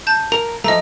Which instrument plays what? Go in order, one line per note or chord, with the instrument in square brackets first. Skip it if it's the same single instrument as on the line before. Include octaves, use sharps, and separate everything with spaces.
[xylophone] A5 G6
[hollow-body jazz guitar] A#4 [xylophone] F7
[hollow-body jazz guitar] F3 A3 [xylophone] D#5 A#5